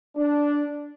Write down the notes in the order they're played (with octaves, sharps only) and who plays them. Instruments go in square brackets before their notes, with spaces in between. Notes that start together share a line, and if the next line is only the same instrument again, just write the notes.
[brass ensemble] D4